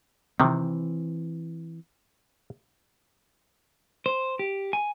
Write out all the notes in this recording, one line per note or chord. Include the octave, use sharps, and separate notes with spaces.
C3 D#3 E3 C4
C5
G4
G#5